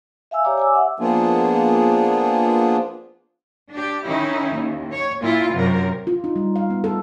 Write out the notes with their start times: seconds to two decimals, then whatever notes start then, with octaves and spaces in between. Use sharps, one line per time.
0.31 E5 F5 G#5 E6
0.45 G4 C#5 D5 A#5 D6
0.57 G#5 D6 E6
0.74 E5 F#5
0.99 F3 A#3 B3 D4 F4 G#4
3.71 D4 G4
4.05 D#3 C#4 D#4 E4
4.55 D#2
4.92 C#5
5.21 A#2 E4 F4
5.54 F#2 C3 A#4
6.07 F4
6.24 D#4
6.36 G3
6.56 F5
6.70 B3
6.84 A4